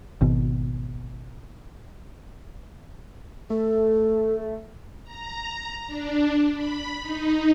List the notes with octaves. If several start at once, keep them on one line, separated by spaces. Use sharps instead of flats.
G#1 B2
A3 A4
A#5
D4
B5
D#4